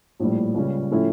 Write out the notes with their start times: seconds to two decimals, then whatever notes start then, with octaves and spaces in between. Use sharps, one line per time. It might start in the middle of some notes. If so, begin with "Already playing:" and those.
0.20 A#1 A2 G3
0.55 C#2 C#3 G3 C#4 G4
0.91 A2 F3 A3 C#4 E4